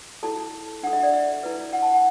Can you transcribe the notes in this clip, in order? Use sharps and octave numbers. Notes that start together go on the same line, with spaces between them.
E4 A4 A5
D4 A4 F#5
E5
D5
E5
E4 B4
F#5
A5
F#5